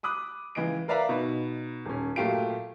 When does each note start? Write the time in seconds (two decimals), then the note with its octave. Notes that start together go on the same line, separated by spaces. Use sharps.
0.03 B5 D6 D#6 F#6
0.55 C#2 E3 D#5 D7
0.88 A#4 B4 D5 E5 F5 A#5
1.09 B2 D#4 B5
1.85 D#1 C#4
2.16 A#2 F#3 A3 G4 F5 D7